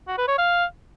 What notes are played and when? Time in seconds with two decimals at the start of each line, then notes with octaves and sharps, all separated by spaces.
0.08 F#4
0.18 B4
0.28 C#5
0.38 F5